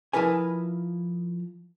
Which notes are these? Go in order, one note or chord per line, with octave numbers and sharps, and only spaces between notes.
F3 E4 A#4 B4 G#5